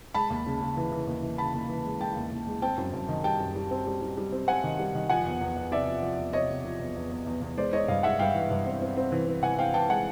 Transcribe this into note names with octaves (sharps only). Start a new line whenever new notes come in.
G#3 A5 B5
D#2
C#3
C#3
E3
E3
D#2
E3
C#3 A5 B5
D#2
E3
G#3
G#3 G5 A5
D#2
D#2
G#3
C4 G5 A5
F#2
F#2
D#3
G3 G5 A5
F#2
G3
C4
G3
G3
G3
C4
C4 F#5 G#5
D#3
G3
D#3
F3 F#5 G#5
E2
E2
E2
C3 D5 E5
F3
F3
E2
C3 C#5 D#5
C3
F3
E2
E2
E2
E2
E2
G#3 C5 D5
G#3 C#5 D#5
G2 D#5 F5
G#3 E5 F#5
G2 F5 G5
E3
G2
C4
C4
C4
E3
C4
E3 F#5 G#5
C4 F5 G5
E3 G5 A5
G#3 F#5 G#5